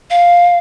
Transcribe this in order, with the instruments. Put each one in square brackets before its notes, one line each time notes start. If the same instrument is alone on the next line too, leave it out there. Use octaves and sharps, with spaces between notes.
[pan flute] F5